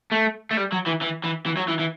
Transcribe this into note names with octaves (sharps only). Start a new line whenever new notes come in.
A3
A3
G3
F#3
E3
E3
E3
E3
F#3
E3
E3